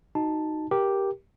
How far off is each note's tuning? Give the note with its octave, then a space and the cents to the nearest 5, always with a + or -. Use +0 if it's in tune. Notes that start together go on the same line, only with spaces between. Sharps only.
D#4 +0 F#4 +0 A5 +0
G4 +0 A#4 +10